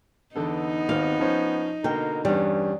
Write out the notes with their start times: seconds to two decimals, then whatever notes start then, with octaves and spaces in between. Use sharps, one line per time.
0.36 E2 D3 B3 D#4 A4
0.89 G#1 D#2 C4 F5
1.20 F3 C#4 C5
1.84 B2 D3 A#3 A#4 G5
2.25 E2 G2 G3 C#4